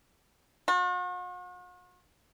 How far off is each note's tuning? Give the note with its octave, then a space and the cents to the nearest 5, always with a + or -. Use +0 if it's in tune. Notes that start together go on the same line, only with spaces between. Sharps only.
F#4 -45